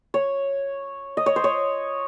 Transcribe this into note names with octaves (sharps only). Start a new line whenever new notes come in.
C#5
D#5
C#5
C5
C#5